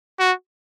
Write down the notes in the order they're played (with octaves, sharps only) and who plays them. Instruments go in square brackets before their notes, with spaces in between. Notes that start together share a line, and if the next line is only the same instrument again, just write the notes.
[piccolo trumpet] F#4